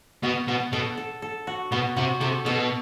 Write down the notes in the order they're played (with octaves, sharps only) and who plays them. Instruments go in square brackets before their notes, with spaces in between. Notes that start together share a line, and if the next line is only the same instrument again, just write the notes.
[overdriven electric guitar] B2 [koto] B3
[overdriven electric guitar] B2 [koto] B3
[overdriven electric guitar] B2 [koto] A4
[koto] A4
A4
F#4
[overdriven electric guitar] B2 [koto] B3
[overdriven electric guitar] C3 [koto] F#4
[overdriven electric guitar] C3 [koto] A4
[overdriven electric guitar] B2 [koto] A4